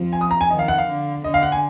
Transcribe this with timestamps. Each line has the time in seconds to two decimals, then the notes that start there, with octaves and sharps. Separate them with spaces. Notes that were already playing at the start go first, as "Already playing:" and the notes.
Already playing: F2 F3
0.13 G#5
0.21 D#6
0.31 A#5
0.41 G#5
0.50 D#3 D#5
0.59 F5
0.68 F#5
0.78 F5
0.87 D3
1.24 D3 D#5
1.34 F5
1.43 F#5
1.52 G#5